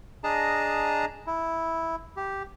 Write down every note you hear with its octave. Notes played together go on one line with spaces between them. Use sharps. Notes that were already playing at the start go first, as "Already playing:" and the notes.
D4 G#4 D#5 A5 A#5
E4
G4